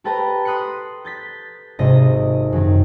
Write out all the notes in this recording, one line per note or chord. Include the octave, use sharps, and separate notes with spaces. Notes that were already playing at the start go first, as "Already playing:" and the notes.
G4 A4 B4 G5 A5 A#5
C6 D#6 F#6 B6 C#7
G6 A6 B6
G#1 C3 D#5 A#6
F#2 D#3